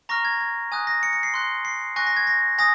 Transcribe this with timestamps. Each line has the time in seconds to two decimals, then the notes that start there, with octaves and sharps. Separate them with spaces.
0.09 A#5 C#6 F6 A#6
0.25 G#6
0.40 G#6
0.72 G#5 D#6 F#6
0.87 A#6
1.03 C#7
1.13 C#7
1.23 C7
1.34 C6 F#6
1.65 C7
1.96 G#5 C#6 F#6 A#6
2.07 A#6
2.17 G#6
2.27 A#6
2.58 G#5 D#6 A#6